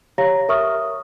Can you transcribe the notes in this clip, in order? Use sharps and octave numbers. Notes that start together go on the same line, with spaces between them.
G4 C#5 F5 A#5 A#6
A#4 E5 C#6 D#6 F6